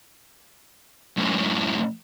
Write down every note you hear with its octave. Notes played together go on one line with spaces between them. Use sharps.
F#2 A2